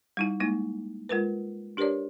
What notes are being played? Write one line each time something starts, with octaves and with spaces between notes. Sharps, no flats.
G3 D#4 E4
G#3 A#3 D#4 E4
G#3 F4 A#4 B4
D4 G4 A#4 B4 C#5 D5